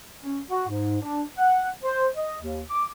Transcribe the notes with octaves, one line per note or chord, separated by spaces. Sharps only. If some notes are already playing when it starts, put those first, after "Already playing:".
C#4
F#4
G#2
D4
F#5
C5
D#5
D#2
D6